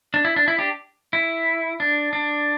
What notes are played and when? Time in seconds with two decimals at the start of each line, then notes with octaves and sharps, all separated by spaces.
0.14 D4
0.25 E4
0.36 D4
0.48 E4
0.58 D4 G4
1.13 E4
1.80 D4
2.13 D4